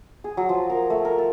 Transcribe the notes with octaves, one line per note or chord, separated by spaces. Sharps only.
G#4
F#3
F3
A#4
A3
A#4
A4